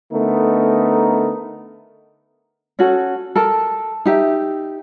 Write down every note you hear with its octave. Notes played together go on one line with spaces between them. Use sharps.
D3 A3 B3 D#4 A#4
C#4 F#4 A4
A4 A#4 A5
D#4 G4 E5